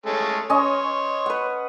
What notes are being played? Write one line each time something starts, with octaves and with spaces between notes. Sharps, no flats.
G#3 A3 C#4
C#4 C#5 D#5 C6
B4 F#5